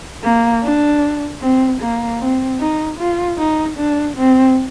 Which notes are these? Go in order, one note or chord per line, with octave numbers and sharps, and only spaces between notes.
A#3
D4
C4
A#3
C4
D#4
F4
D#4
D4
C4